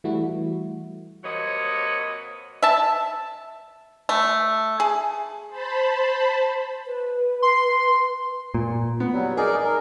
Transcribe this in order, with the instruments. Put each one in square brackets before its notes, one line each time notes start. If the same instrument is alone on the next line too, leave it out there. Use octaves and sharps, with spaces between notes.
[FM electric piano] E3 G3 A3 E4 F#4
[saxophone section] C3 F#3 A#3 B4 C#5 D#5
[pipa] E5 A5
A3
G#4
[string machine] C5 A5 B5
[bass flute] B4
[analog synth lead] C6
[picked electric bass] A#2
[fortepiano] B3
[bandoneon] F#3 G3
[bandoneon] D#4 A#4 D5 [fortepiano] G#4
[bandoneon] A#4